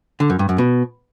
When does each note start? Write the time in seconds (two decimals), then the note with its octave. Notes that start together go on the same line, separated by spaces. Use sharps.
0.20 D3
0.30 F#2
0.39 G2
0.49 F#2
0.58 B2